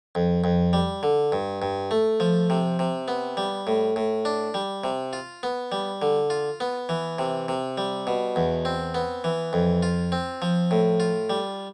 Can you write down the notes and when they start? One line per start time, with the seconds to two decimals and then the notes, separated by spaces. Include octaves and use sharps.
0.15 F2
0.44 F2
0.73 G3
1.03 D3
1.32 G2
1.62 G2
1.91 A3
2.20 F3
2.50 C3
2.79 C3
3.08 B3
3.37 G3
3.67 A2
3.96 A2
4.25 D4
4.54 G3
4.84 C3
5.13 F4
5.43 B3
5.72 G3
6.02 D3
6.30 F4
6.60 B3
6.89 E3
7.19 C3
7.48 C3
7.78 G3
8.07 B2
8.36 E2
8.65 C4
8.95 B3
9.24 E3
9.53 F2
9.83 F4
10.12 C4
10.42 F3
10.71 A2
11.00 F4
11.30 G3